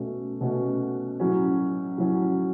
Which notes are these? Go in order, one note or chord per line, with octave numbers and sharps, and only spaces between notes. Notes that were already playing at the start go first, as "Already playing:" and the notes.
Already playing: B2 A3 C#4 F#4
B2 A3 C#4 F#4
A2 F#3 C#4 F#4
A2 F#3 C#4 F#4